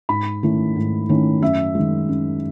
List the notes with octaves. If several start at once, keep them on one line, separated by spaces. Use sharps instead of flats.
G#2 B5
D#3 A3 C#4 E4
G#2
D#3 A3 C#4 E4
F#2 E5
D#3 G#3
F#2